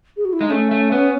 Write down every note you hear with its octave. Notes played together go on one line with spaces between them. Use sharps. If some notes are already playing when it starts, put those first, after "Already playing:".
G#4
F#4
E4
G#3 D#4
A3 C#4
A3
B3